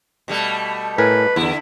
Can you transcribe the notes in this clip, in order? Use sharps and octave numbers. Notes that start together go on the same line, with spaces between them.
B2 G3 A3
A2 A#4 B4 G#5
E2 D3 B3 E4